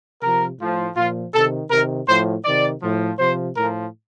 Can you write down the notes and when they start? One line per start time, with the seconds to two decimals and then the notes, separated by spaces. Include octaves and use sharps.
0.22 C3 F3 A#4
0.60 A2 F3
0.97 A#2 F3 F4
1.34 C3 D#3 A4
1.71 C3 D#3 A#4
2.08 A2 F3 C5
2.45 C3 D#3 D5
2.82 A2 F3
3.19 C3 F3 C5
3.56 A2 F3 A#4